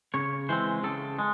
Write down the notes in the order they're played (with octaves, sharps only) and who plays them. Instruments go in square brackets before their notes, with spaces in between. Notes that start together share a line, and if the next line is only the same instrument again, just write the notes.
[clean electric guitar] C#3 C#5
E3 G#3 C4 C5
C#3 A4
G#3